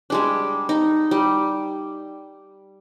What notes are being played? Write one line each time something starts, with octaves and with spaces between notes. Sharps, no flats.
G3 G#3 D4
D#4
G3